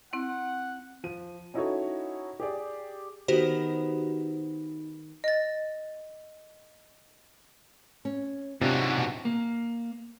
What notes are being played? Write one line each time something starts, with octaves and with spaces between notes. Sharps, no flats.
C4 E4 F#5
F3 D#7
C#4 D#4 E4 F#4 A4 C#5
G4 G#4 D5
D#3 B3 D#4 F#4 G4 C5
D#5 A6
C#4
G#2 C3 F#3 D4 F4 D#5
B2
A#3